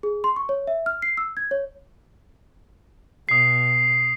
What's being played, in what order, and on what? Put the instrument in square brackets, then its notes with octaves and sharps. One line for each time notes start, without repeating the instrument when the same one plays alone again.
[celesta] G#4
C6
C#6
C#5
E5
F6
C7
E6
G#6
C#5
[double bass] B2 [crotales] D#6 C7